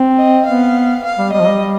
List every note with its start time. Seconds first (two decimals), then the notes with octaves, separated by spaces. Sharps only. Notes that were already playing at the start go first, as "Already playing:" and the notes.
Already playing: C4
0.18 D#5
0.46 B3 F5
1.04 F5
1.18 G3
1.32 G3 D#5
1.40 F3
1.47 G3